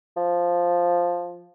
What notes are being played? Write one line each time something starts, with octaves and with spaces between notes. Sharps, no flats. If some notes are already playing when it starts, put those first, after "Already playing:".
F3